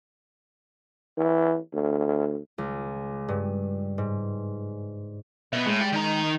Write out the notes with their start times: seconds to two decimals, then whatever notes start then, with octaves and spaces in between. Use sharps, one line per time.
1.18 E3
1.74 D2
2.58 C#2
3.28 G2
3.98 G#2
5.53 B2 B3 E5
5.66 A2 G#3
5.81 D5 G5
5.92 D#3 A#5